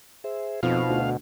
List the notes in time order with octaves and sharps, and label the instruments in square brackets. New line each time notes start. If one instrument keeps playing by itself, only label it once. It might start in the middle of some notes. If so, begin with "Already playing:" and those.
[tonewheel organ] G#4 C5 E5
[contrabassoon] F2 [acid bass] B2 [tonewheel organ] D#4 F4 C5 [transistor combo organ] F5
[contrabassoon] D2